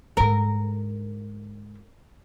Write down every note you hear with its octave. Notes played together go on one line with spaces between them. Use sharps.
G#2 D3 A#4